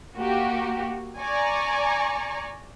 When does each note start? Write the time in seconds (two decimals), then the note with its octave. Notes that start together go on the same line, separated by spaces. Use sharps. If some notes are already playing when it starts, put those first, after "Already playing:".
0.15 A#3 F#4 G4
1.18 D5 G#5 A#5 C#6